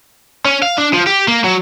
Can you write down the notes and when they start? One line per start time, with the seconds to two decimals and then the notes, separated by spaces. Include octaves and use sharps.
0.45 C#4
0.63 F5
0.78 D4
0.94 F3
1.07 G4
1.28 A#3
1.44 F#3